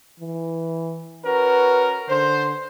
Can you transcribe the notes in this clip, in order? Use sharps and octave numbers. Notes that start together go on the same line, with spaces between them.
E3
C#4 F#4 A#4 B4
D3 C5